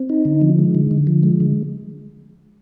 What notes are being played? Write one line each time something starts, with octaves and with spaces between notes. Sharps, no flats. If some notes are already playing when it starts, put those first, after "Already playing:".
Already playing: C4
D#4
D3
F3
G#3
D3
D3
F3
G#3
D3